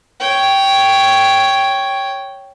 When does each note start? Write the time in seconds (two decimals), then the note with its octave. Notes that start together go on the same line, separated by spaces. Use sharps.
0.20 C#5 G5